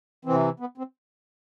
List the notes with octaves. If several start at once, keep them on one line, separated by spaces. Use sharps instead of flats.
C3 E3 C4
B3
C4